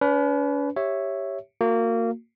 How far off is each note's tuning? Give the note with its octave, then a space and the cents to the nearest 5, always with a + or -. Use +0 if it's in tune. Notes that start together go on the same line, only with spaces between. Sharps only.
C#4 +45 B4 +10
G4 +0 C#5 -5 E5 +0
A#3 -25 F#4 -30